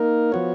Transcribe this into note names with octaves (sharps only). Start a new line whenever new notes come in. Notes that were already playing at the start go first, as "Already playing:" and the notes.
Already playing: A#3 D#4 A#4
F3 B3 F#4 C#5